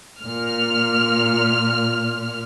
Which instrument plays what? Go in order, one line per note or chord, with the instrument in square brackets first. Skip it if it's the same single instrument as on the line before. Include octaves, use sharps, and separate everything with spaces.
[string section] A#2 F6